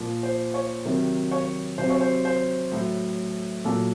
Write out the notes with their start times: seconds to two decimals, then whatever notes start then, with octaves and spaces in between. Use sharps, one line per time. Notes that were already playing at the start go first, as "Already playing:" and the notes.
Already playing: A#2 F3
0.23 C5
0.54 C#5
0.85 C3 D#3 F#3
1.31 C#5
1.78 C3 F#3 C5
1.90 C#5
2.01 C5
2.25 C5
2.72 A2 F#3
3.65 A#2 F#3 A4